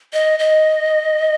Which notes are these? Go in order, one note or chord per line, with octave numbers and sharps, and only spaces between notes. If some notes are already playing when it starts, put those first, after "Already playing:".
D#5
D#5